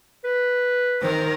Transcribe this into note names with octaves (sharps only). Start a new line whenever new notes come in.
B4
D#3 A#4 C5